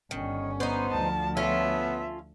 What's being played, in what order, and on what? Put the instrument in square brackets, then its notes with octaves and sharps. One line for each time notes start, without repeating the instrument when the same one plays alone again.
[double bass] G1 C#4 [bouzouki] D#3
[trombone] B3 [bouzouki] D#4 C5
[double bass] D2 F3 [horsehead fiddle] A5
[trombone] B3 [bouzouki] C#4 F4 A4 [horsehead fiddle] E5